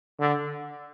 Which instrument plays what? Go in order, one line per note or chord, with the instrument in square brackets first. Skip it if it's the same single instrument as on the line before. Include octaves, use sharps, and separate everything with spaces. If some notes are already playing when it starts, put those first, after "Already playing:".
[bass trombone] D3